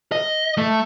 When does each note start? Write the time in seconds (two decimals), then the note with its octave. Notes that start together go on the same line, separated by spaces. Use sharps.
0.12 D#5
0.58 A3